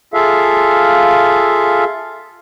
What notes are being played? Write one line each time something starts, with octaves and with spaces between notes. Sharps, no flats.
F4 G#4 A4 E5 F5